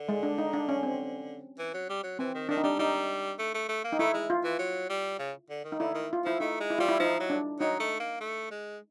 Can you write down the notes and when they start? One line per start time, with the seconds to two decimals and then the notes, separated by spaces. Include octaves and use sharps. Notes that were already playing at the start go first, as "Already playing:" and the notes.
Already playing: D3
0.09 G#3
0.23 D4
0.38 D#4
0.53 D4
0.69 C#4
0.83 C4
1.59 E3
1.74 F#3
1.90 G3
2.04 F#3
2.19 E3 C4
2.35 D#3
2.49 D#3 D4
2.57 D#4
2.63 G3 D4
2.79 G3 D#4
3.39 A3
3.54 A3
3.69 A3
3.84 A#3
3.92 D#4
3.99 A3 E4
4.14 G#3
4.30 F4
4.44 E3
4.59 F#3
4.90 G3
5.19 C#3
5.50 D3
5.64 D#3
5.72 D#4
5.79 D3 E4
5.94 D#3
6.13 F4
6.25 F3 E4
6.40 A3 D#4
6.60 G#3
6.70 E4
6.79 G3 F4
6.88 E4
7.00 F3 D#4
7.20 F#3
7.30 D4
7.60 F#3 D#4
7.80 A3
8.00 A#3
8.21 A3
8.51 G#3